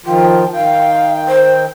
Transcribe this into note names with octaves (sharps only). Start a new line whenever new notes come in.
D#3 F3 F4 G5
D#3 F5 G5
C5